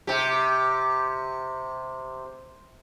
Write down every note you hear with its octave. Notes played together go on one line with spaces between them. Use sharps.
C3 G4